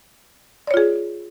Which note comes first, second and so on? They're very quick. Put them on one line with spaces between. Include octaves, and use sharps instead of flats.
D5 C#5 F4 G#4